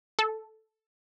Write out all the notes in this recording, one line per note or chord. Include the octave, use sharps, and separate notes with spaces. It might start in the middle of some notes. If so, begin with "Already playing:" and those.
A4